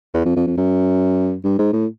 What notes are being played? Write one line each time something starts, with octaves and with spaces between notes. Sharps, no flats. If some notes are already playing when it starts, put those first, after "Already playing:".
E2
F2
F2
F2
F#2
G2
G#2
A2